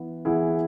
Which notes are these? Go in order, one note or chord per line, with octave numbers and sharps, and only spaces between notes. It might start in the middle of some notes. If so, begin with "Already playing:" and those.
Already playing: E3 B3 E4
E3 B3 E4 G#4